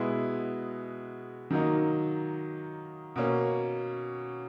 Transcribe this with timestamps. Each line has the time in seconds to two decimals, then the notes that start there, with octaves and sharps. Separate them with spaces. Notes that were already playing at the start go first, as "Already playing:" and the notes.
Already playing: B2 G#3 B3 E4
1.51 D#3 F#3 A#3 D#4
3.16 B2 A#3 C#4